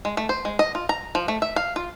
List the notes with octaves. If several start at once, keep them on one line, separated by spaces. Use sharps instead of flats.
G#3
A3
C5
G#3
D#5
F4
A#5
F3
A3
E5
F5
F4